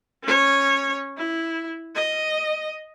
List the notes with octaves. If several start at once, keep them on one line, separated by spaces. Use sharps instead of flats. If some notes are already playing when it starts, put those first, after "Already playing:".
C#4 C#5
E4
D#5